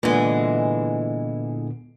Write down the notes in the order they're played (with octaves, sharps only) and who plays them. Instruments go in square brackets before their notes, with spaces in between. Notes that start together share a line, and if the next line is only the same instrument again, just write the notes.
[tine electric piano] A#2 D3 B3 [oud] E3 G#3